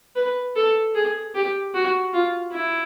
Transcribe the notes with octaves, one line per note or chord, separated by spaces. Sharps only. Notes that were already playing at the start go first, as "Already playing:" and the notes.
B4
A4
G#4
G4
F#4
F4
E4